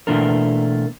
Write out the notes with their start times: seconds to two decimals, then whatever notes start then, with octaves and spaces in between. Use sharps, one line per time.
0.07 B2 E3 A3 A#3 D4 A#4